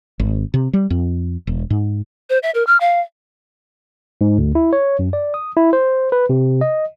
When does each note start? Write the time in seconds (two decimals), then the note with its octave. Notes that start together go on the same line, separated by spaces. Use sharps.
0.20 G#1
0.54 C3
0.73 G3
0.90 F2
1.47 E1
1.70 G#2
2.30 C5
2.43 E5
2.55 A#4
2.67 F6
2.80 F5
4.21 G#2
4.38 D2
4.55 E4
4.73 C#5
4.99 F#2
5.13 D5
5.34 D#6
5.57 E4
5.73 C5
6.12 B4
6.30 C3
6.61 D#5